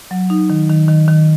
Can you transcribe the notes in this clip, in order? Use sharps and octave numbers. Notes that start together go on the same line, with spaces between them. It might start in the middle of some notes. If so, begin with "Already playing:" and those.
F#3
D#4
D#3
D#3
D#3
D#3